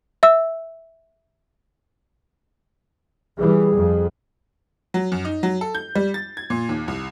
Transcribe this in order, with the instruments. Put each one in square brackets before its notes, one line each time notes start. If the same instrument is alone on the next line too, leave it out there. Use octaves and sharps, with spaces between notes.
[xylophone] E5 E6
[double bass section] E3 G3 [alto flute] G#4
[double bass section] F2
[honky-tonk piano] F#3
F#2
D#4
F#3
A4
G6
G3
A6
G#6
A#2
D#2
C2